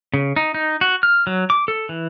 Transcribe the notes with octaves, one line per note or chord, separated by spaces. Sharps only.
C#3
D#4
D#4
F#4
F6
F#3
D6
A4
E3